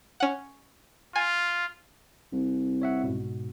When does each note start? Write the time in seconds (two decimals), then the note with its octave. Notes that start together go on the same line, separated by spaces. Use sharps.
0.20 C#4 F#5
1.16 F4 G#5
2.32 C2
2.82 C#5 E5 F#5
3.04 G#2 B2